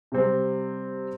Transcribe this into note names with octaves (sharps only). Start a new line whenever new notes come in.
C3 G3 C4